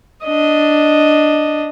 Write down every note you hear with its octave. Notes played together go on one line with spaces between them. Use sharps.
D4 D#5